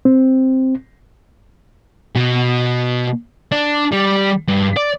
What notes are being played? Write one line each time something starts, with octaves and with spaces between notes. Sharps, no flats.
C4
B2
D4
G3
G2
D5